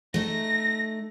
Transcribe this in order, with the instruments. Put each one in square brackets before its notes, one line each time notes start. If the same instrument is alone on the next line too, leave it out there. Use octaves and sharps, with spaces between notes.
[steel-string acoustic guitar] A3 D#4 [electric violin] A#6